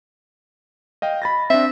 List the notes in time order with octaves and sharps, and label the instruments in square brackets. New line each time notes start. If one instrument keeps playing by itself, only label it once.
[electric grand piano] D#5 F5 G5
B5 A6 A#6
[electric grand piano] C4 D4 [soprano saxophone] E5